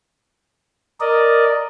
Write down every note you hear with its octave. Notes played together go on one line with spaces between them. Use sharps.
A#4 D5 D#5